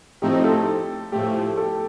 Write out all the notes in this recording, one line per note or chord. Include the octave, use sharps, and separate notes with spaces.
A2 F3 A3 C4 D#4 G4
A4
A2 F3 A3 G4
A4